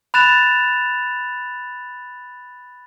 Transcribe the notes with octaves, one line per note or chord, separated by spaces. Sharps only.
B5 F#6 A6 E7 F7